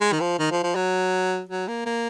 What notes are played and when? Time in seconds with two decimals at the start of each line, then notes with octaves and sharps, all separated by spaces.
0.01 G#3
0.12 D#3
0.20 F3
0.39 D#3
0.51 F3
0.63 F3
0.75 F#3
1.49 F#3
1.68 A#3
1.86 A#3